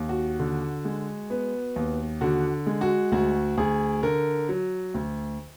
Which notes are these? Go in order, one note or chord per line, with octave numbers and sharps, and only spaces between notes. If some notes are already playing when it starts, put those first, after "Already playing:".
Already playing: D#2
F#4
D3
G#3
B3
D#2
D3 F#4
G#3
F#4
D2 F#4
D2 G#4
D3 A#4
F#3
D2